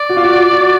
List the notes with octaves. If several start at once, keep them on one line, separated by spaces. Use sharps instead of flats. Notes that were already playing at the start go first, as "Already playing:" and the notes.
Already playing: D5
F#4
F4
F#4
F#4